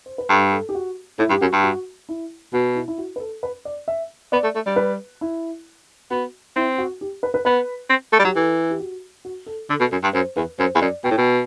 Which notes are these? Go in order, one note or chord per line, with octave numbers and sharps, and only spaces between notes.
C5
B4
G2 A4
A4
G4
F#4
A2 E4
G2 G4
F#2 F#4
G2
F#4
E4
B2 F#4
E4
E4
F#4
B4
A4
B4
D5
E5
B3 D5
A3
A3
G3
B4
E4
B3 F#4
C4 E4
F#4
G4
B4
B4
B3 B4
C4
A3
G3
F#3 G4
E3 A4
G4
F#4
F#4
A4
D3 A4
B2
F#2
G2
F#2 C5
E2 B4
F#2 C5
E2
F#2 D5
B2 G5
A2
B2